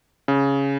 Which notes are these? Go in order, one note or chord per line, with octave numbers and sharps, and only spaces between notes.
C#3